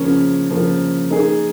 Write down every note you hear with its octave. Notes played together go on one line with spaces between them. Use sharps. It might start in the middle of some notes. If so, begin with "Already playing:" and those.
Already playing: C#3 F3 A#3 C#4
C#3 F3 A#3 C#4
A#3 D#4 G#4